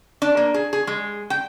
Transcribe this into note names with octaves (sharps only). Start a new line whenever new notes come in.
D4
A#3
G#4
G#4
G#3
G5